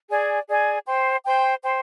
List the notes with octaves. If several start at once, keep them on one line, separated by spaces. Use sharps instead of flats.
G#4 D5 G#5
G#4 D5 G#5
C5 G5 C6
C5 G5 C6
C5 G5 C6